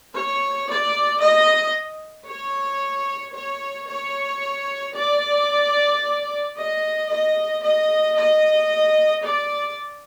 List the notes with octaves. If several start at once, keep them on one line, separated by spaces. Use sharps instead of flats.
C#5
D5
D#5
C#5
C#5
C#5
D5
D#5
D#5
D#5
D#5
D5